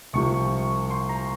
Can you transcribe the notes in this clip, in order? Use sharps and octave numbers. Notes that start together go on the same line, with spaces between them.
C2 C3 F3 C#6
C6
A#5